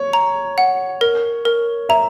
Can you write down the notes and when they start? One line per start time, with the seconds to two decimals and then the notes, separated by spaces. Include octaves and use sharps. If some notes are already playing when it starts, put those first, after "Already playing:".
Already playing: C#5
0.13 A#5
0.58 F#5
1.01 A#4
1.45 A#4
1.89 E5 A#5